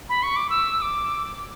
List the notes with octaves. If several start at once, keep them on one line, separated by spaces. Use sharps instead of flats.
B5
C#6
D6
E6
D6